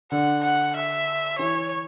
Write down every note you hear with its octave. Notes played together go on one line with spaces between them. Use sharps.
D3 F#5
F#5
E5
E3 C#5